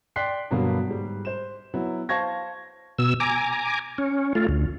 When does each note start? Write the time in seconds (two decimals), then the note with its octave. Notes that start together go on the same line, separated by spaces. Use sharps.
0.16 D5 G5 C6 F#6 B6 C7
0.51 G2 B2 D3 F#3 A#3 B3
0.87 G#2 G3
1.25 C5 E7
1.74 F#3 B3 E4
2.09 C5 F5 A5 C#6 G#6 A#6
2.99 B2 E6
3.20 G#5 A#5 D6
3.98 C#4
4.35 A3 F4
4.49 D2